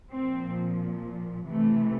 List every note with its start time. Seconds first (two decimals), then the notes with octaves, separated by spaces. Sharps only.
0.14 A#2 F3 C4
1.50 C3 E3 A3